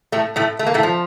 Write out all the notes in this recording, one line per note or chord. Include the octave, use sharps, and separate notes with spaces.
A2 A3
A2 A3
A3
A#3
A2 A3
F3